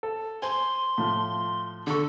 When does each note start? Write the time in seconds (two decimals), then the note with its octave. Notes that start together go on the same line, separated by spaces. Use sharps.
0.03 A4
0.42 C5 G#5 C6
0.98 A2 F3
1.87 D3 A4 C#6